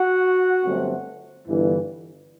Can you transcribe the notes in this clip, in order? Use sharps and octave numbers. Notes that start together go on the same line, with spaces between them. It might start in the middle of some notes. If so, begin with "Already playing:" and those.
Already playing: F#4 F#5
G1 G2 F#3 A3 C4
G1 G2 E3